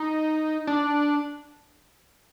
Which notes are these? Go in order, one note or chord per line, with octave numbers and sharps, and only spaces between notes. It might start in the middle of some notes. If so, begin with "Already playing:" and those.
Already playing: D#4
D4